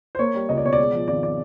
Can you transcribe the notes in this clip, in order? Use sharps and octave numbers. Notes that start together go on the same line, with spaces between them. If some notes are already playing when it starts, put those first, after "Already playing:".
C5
A#3 C#5
G3
C#2 D#5
D5
B2 C#5
D5
G#3
F3
G#1 D5
D5